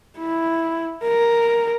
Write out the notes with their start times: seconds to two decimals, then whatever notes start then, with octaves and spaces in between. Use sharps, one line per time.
0.18 E4
1.04 A#4